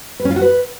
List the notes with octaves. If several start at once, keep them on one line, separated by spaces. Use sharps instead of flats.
B4
C#4
F4
F#4
B4